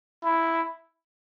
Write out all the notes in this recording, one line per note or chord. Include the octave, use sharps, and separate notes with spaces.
E4